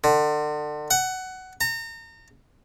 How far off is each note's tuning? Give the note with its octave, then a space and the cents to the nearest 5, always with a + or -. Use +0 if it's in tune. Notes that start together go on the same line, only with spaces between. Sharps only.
D3 +35
F#5 +15
A#5 -35